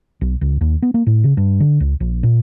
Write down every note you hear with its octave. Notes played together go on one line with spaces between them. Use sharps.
B1
C#2
D#2
B3
A#3
A2
C#3
G2
D3
C#2
A#1
A#2